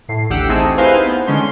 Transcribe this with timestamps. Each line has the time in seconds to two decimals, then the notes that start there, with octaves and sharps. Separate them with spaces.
0.08 A2 C7
0.29 A1 D2 G4 F#5 E6
0.49 A3 C4 D#4 G4 G#4
0.77 D#4 E4 B4 C5 F5 G#5
1.06 B3
1.26 D3 G#3 C#4 C6